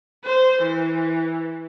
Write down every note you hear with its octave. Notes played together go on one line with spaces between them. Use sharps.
C5
E3